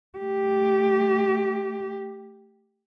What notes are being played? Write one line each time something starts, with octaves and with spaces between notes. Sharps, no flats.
A3 G4